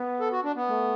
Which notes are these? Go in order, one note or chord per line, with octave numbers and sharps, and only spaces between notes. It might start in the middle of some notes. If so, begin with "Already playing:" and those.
Already playing: B3
A4
F#4
D4
B3
A3